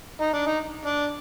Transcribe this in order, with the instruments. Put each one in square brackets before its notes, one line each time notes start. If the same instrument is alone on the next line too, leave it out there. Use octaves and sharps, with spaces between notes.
[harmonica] D#4
D4
D#4
D4